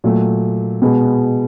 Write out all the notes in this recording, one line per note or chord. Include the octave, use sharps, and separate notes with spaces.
A#2 F#3 A3
B2 G#3 B3